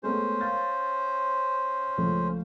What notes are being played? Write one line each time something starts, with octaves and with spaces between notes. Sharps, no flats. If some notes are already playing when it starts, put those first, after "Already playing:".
G#3 A3 B3 C#4 C5
F5 G6 A6
C#2 F3 A3